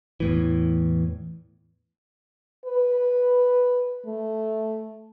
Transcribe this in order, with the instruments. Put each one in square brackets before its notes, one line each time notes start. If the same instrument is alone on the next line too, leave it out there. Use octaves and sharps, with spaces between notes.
[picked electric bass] E2 A2 E3
[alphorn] B4
A3